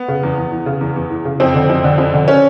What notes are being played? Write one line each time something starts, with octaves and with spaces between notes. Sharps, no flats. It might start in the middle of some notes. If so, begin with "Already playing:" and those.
Already playing: B3
C#3
E2
E2
E3
C#3
E2
E2
E3
C#3
F2 C4
D3
F2
D3
F2
D3
C#4